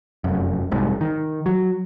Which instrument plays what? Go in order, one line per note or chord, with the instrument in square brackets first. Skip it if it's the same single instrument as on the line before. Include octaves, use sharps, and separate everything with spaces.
[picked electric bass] F1 F#2
F1 C2 G#2
D#3
F#3